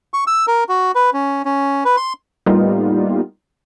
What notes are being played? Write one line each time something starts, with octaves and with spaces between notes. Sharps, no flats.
C#6
E6
A#4
F#4
B4
C#4
C#4
B4
C6
A2 G3 A#3 B3 D#4 F4